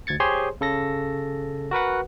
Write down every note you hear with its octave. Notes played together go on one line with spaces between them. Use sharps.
D2 G#6 A6 C#7
G4 G#4 C5 C#5 G#5 C6
C#3 A4 A#6
F#4 A#4 B4 F#5